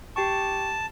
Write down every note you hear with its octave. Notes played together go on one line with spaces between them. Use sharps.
G4 G5 A5 C#6